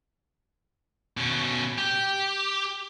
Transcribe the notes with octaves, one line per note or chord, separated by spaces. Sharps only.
B2 C#4
G4